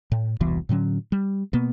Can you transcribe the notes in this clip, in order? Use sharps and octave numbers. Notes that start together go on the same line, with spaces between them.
A2
E1 C2 B2 E3
A2 D3 F#3 C#4
G3
B2 A#3 B3